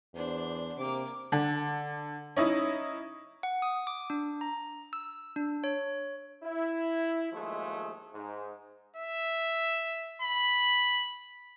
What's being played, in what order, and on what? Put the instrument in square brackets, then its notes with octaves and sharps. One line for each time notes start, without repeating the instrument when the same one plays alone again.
[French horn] E2 [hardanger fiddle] D4 C5
[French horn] C3 [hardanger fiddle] A#3 D6
[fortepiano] D3
C#4 D#4 E4
[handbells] F#5
D#6
D6
D4
A#5
E6
D4
C#5
[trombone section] E4
D#2 F3 G#3 A3
G#2
[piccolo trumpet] E5
B5